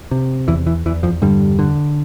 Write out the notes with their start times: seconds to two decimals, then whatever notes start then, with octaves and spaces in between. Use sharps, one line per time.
0.11 C3
0.48 E2 E3
0.67 E3
0.86 E2 E3
1.03 F2 F3
1.22 G2 D3 G3
1.59 D3